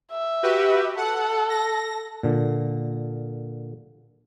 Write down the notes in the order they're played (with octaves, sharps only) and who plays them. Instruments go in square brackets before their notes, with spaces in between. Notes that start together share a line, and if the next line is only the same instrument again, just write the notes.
[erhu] E5
[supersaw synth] F#4 G4 B4
[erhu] A4 [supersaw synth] F#5
[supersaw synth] A#6
[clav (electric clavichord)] A#2 D3